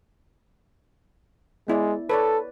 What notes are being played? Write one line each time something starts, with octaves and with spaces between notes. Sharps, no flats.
G#3 B3 E4 D5
A4 B4 C#5 D5